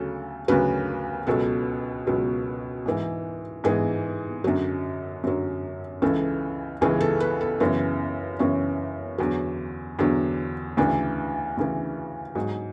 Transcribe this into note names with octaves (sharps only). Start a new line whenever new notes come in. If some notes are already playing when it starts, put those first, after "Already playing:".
Already playing: D2 C#3 F#3 A4
D2 C#3 F#3 B4
C#2 B2 F#3 A4
C#2 B2 F#3
G#2 E3
G#2 E3 G#4
F#2 D3 F#3
F#2 D3 F#3
C#2 C#3 E3 A4
C#2 C#3 E3 G#4
A4
B4
A4
F#2 C#3 E3 B3
F#2 C#3 E3 C#4
E2 D3 F#3
E2 D3 F#3
D2 C#3 E3 D4
D2 C#3 E3
G#2 F#3